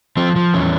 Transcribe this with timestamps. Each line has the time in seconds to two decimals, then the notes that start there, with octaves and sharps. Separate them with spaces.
0.17 F3 C4
0.36 F3
0.54 E2 C#4